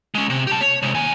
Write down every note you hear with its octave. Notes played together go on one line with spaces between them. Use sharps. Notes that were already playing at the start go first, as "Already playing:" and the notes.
G#3 C#4
C3
G4 A5
C#5
C3 G#3
D#2 G#5